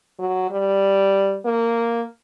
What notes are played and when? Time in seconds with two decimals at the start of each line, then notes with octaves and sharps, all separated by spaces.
0.19 F#3
0.51 G3
1.46 A#3